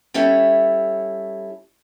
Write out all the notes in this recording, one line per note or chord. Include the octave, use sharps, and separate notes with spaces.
G3 C#4 E4 A4 C#5